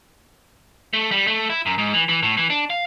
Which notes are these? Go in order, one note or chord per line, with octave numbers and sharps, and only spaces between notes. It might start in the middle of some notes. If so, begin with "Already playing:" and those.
A3
G3
A3
E4
F#2
G#2
E3
E3
A2
E3
D4
F5